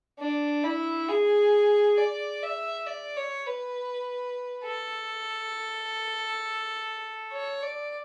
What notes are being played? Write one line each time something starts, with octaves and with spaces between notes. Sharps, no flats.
D4
E4
G#4
D5
E5
D5
C#5
B4
A4
C#5
D5